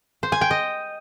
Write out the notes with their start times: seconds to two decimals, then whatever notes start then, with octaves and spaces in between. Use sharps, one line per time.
0.23 C5
0.32 G#5
0.41 G5
0.51 D#5